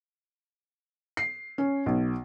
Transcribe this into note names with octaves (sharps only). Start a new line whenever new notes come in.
C7
C#4
B1